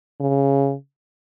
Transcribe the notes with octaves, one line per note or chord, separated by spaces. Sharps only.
C#3